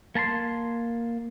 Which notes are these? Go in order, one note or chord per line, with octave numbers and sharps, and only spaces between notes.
A#3 A5 A#5 C6